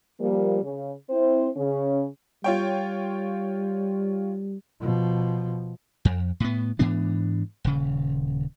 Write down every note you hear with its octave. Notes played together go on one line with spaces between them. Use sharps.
F3 G3 A#3
C#3
C4 E4 C5
C#3 C#4
G3 F4 C#5 G5
B2 F3
F2
A2 B3
G#2 E3 B3 D4
D#1 C#3